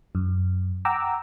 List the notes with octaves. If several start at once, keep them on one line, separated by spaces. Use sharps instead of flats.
F#2
F#5 G5 A#5 D6 E6